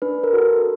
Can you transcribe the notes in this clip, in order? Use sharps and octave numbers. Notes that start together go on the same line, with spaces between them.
D4 B4
A#4
F#4 A4